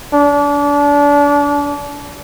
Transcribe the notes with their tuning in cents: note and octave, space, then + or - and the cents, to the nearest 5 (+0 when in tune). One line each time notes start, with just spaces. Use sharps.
D4 -30